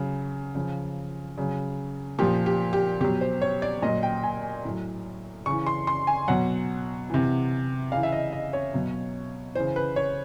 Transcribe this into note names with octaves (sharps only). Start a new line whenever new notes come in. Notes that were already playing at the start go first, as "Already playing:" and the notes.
Already playing: C#3 F#3
C#3 F3
C#3 F#3
A#2 F3 G4
G4
G4
B2 F#3 G4
C5
C#5
D5
A#2 F#3 D#5
G5
G#5
A2 F#3
C#3 E3 C#6
C6
C6
G#5
B2 F#3 F#5
C3 E3
C#3 E3 F5
E5
D#5
D#5
C#5
B2 F#3
C#3 E3 C5
B4
C#5